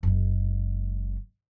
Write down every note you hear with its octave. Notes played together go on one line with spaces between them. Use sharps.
F#1 G#3